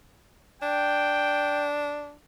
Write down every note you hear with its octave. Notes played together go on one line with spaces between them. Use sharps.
D4 G5